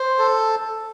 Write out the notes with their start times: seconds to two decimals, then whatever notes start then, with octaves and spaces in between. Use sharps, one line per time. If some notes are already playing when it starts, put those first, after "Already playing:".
Already playing: C5
0.18 A4